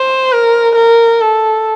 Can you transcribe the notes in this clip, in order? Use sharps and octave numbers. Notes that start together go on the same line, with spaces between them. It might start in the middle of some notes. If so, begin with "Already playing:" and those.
Already playing: C5
A#4
A#4
A4